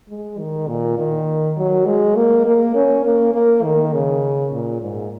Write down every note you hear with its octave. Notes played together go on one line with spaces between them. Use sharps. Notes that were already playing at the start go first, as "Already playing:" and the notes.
G#3
D#3
A#2
D#3
F#3
G#3
A#3
A#3
C#4
A#3
A#3
D#3
C#3
A#2
G#2